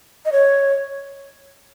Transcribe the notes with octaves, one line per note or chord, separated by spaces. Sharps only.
D#5
C#5